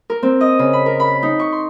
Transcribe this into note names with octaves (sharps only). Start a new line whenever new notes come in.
A#4
C4
D#5
C#3
B5
A#4
B5
D#4
C#6
C6